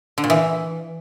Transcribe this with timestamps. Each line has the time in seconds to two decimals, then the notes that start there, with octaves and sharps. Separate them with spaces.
0.18 D3
0.24 A#2
0.30 E3